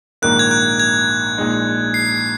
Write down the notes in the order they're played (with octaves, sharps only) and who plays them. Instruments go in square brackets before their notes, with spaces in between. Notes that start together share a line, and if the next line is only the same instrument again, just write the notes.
[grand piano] A#1 G#2 D#3 A#3 [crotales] F#6
[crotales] G#6
F#6
G#6
[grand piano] A#1 A#2 G#3 D#4
[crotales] C7